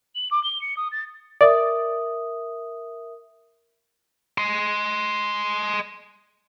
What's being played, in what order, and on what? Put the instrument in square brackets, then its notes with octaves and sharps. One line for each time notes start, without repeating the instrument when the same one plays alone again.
[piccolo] F#7
D6
G7
C#7
D#6
A6
[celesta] A#4 E5 D#6 [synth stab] D5
[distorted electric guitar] D#5 C6